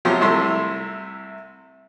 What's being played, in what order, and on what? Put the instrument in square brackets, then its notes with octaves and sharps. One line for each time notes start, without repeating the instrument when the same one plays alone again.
[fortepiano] C3 F3 F#3 G4 C6
C2 C3 A3 E4 C6